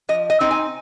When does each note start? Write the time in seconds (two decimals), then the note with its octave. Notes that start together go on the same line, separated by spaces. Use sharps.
0.09 F3 D#5
0.30 D#5
0.40 C4 D#4
0.51 G#5